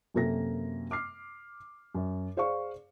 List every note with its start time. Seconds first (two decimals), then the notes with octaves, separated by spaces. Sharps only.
0.14 F#2 C3 A#3 A4 A#6
0.91 D6 F6 C7
1.95 F#2
2.37 G#4 C5 D5 F5 C#6